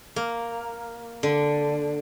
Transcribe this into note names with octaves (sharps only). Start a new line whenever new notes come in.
A#3
D3